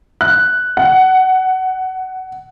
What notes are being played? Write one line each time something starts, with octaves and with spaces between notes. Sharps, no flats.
F#6
F#5